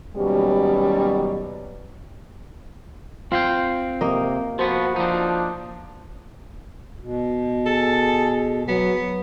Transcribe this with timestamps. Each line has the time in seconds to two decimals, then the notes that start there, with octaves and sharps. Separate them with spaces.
0.16 D#2 B2 F#3 G3 C#4 G4
3.32 C4 F4 F5 G5
4.01 C3 A#3 D#5
4.59 F3 B3 F#4 C5
4.96 F3 D4 D#4
7.00 B2
7.66 G#4 A4
8.68 F#3 B3